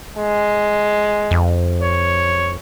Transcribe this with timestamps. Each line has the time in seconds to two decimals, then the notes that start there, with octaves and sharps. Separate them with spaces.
0.17 G#3
1.31 F2
1.83 C#5